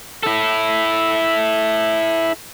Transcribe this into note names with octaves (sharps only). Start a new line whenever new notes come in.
E4 A4